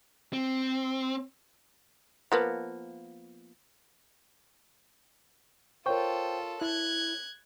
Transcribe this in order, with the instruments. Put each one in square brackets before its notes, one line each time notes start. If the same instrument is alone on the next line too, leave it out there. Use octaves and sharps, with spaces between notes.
[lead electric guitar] C4
[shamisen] F3 A#3 B3
[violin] F4 A4 [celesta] A#4 C#5 C#6 [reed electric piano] C5 G5
[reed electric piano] E4 [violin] F#6 G#6